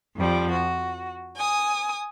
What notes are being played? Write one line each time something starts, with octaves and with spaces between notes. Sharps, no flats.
F2 F3 G3
F#4
G#5 D#6